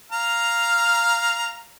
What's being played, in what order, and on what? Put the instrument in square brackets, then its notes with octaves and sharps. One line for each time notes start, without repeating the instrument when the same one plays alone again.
[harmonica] F5 A#5